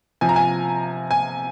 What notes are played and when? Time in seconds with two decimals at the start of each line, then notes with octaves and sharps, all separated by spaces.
0.21 C3 F3 G#5
0.29 A#5
0.36 G#5
1.11 G#5